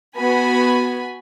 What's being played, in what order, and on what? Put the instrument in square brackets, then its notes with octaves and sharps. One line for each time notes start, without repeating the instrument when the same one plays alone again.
[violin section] B3 F#4 G#5 B5